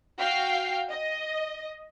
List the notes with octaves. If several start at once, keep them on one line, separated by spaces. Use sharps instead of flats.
F#4 F5 G5 F6 C7
D#5